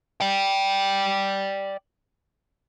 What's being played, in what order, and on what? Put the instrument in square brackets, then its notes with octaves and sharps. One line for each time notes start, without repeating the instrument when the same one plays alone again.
[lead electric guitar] D5 G5